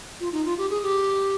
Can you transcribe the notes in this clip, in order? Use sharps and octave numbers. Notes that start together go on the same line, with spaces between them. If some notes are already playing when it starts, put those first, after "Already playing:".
F4
D#4
F4
G4
G#4
G4